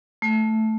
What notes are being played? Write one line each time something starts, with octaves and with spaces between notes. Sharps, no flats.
A3